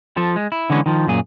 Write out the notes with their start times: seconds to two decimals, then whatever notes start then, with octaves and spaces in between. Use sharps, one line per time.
0.17 F3 A4
0.36 G#3
0.52 E4
0.70 D3 E3 G#3 C#4
0.86 D#3 F3
1.07 F#2 A#2 G#4